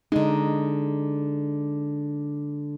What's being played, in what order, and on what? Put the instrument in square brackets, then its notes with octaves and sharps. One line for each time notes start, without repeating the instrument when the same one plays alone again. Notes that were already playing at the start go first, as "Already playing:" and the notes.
[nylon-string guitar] D3 G#3 [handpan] D#4